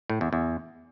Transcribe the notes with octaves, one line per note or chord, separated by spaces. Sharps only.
A2
E2
E2